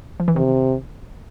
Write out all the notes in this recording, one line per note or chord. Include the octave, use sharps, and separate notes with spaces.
F3
E3
C3 D#3